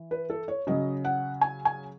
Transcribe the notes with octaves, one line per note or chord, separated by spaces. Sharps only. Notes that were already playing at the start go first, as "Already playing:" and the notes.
Already playing: E3
B4
A4
C#5
C#3 F#3 D#5
F#5
G#5
G#5